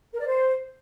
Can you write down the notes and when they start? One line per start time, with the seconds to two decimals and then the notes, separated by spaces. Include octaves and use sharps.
0.13 A#4
0.20 D5
0.27 C5